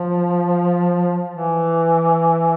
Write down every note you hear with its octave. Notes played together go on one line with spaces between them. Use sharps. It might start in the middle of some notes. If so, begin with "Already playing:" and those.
Already playing: F3
E3